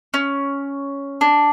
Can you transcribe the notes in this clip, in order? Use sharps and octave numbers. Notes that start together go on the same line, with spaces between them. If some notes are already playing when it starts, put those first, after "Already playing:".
C#4
D4